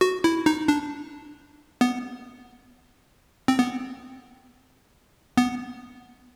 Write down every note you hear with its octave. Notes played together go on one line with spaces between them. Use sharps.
F#4
E4
D#4
D4
B3
C4
B3
B3